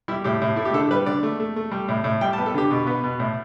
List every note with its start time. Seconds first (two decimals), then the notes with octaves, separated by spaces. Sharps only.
0.08 G3 E4
0.24 A2 G4
0.42 A2
0.56 A3 E4
0.65 G4
0.73 D3 A4
0.91 G3 B4
1.06 D3 D5
1.23 A3
1.40 A3
1.56 A3
1.71 G3
1.88 A2
2.04 A2
2.21 G3 G5
2.33 A5
2.38 B3
2.46 A4
2.54 D3 G4
2.71 B2
2.87 B3
3.04 B2
3.20 A2